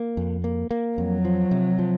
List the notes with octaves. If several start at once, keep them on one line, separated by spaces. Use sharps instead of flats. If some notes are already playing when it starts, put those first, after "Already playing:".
Already playing: A#3
F2
A#3
A#3
F2 F#3
F3
C3
F3